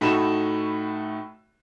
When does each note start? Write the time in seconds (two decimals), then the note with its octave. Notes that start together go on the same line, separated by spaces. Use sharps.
0.01 A2 A3 D#4 F#4 B5 E7